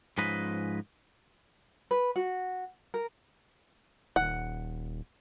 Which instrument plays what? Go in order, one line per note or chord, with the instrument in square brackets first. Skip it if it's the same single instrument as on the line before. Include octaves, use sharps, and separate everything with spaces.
[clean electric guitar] G#2 F3 C#4 B4 D#5 B5
[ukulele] B4
F#4
A#4
[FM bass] D#1 [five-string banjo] F#5